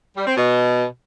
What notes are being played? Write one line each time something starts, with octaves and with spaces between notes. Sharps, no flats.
G3
C4
B2